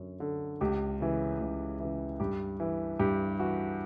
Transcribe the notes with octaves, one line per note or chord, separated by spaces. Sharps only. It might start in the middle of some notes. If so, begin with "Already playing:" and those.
Already playing: F#2 D3
D3
C#2 G4
C#3 E3
C#2
C#3 E3
G2 G4
E3
G2 G4
E3 F#4